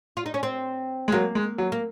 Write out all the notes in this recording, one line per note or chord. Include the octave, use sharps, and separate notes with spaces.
F4
D#4
C#4
C4
G#3
F#3 A#3
G#3
F#3
A#3